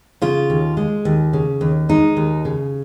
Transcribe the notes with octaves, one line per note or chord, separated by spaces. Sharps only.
C#3 F4
D#2
G#3
D#2
C#3
D#2
G#3 D#4
D#2
C#3